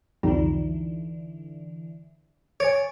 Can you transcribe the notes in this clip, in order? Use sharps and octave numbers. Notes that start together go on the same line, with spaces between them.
C2 F2 D3 E3 G3 D#4 F4 A#5
C#5 G#5 A6 D7